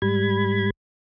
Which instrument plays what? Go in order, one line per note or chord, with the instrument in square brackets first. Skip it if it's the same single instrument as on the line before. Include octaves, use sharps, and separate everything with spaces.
[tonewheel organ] G#2 G3 B5 G#6